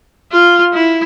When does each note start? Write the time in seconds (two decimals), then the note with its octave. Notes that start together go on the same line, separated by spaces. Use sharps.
0.32 F4
0.74 E4